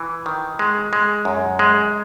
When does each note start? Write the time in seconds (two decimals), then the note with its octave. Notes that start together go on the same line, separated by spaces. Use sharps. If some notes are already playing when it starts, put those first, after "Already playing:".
Already playing: E3
0.26 D#3
0.59 G#3
0.93 G#3
1.25 F#2
1.59 G#3